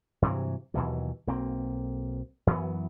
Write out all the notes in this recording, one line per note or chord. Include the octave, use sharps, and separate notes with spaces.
G2 C3 E3 F#3
D#2 B2 E3 F#3
B1 A#3 C4
F#2 E3 F#3 B3